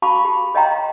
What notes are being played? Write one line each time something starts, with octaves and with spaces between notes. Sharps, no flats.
F#4 F5 A5 B5 C#6 D6
G4
C#5 D#5 F5 G5 A#5 C6